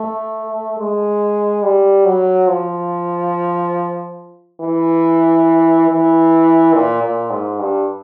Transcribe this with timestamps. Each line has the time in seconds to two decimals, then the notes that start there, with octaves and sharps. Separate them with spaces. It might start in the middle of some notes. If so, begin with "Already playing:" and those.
Already playing: A3
0.79 G#3
1.63 G3
2.06 F#3
2.48 F3
4.61 E3
5.89 E3
6.74 A#2
7.02 A#2
7.31 G#2
7.60 G2